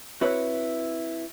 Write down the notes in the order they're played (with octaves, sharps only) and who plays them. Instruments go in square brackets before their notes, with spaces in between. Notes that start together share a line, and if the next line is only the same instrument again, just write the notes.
[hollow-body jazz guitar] C4 E4 F#4 B4 C#5